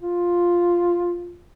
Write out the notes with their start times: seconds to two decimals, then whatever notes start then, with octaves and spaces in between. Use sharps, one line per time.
0.01 F4